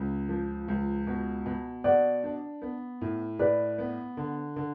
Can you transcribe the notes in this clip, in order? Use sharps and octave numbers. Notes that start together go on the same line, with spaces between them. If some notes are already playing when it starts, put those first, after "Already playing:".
Already playing: C#2 C#3
F3
C#2
B2
B2
B2 D5 F#5
D4
B3
A2
A2 B4 D5
B3
D3
D3